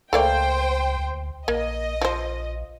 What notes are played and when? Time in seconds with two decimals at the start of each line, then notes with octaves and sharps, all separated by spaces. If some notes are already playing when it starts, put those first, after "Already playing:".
0.13 C#2 A3 A#3 C5 D5 G5
0.98 D2
1.48 A#1 A#3 D#5
2.01 F3 C5